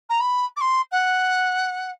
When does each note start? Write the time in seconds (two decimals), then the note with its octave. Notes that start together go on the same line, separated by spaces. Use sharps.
0.09 A#5
0.20 B5
0.56 D6
0.60 C6
0.91 F#5